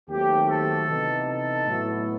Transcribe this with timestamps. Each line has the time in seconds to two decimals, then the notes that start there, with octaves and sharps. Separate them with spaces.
0.09 D#2 D#3 F#3 A3 C4 G4
0.49 A4
0.88 C3 E3 B3 D#4
1.28 A4
1.67 A2 F#3 B3 E4